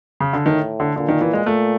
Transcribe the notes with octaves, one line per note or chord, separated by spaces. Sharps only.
C#3
D3
A2 D#3
D3
A#2 D3
D#3
E3
G#3
A#2 A3